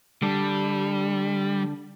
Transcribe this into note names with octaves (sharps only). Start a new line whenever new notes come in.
D3 G3 D4